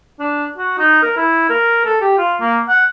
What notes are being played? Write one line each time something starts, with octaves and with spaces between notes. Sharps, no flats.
D4
F#4
D#4
A#4
E4
A#4
A4
G4
F4
A#3
F#5